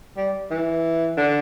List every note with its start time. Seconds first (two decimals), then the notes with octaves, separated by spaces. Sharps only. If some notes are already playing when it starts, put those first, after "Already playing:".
0.17 G3
0.50 E3
1.17 D3